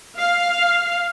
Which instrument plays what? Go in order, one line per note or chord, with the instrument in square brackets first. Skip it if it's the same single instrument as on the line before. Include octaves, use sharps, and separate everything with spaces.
[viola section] F5